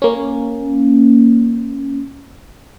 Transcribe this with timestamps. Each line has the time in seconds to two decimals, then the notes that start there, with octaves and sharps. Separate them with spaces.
0.02 A#3 C#4